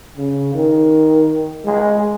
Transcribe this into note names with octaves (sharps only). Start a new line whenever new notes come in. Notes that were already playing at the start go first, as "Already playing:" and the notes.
C#3
D#3
G#3